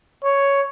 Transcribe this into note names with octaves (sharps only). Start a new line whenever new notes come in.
C#5